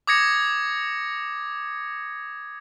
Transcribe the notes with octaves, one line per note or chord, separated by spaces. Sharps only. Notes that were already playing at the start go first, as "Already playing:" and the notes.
D6 D#6 G#6 A#6 C#7